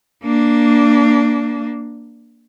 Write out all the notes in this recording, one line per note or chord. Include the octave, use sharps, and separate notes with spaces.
A#3 D4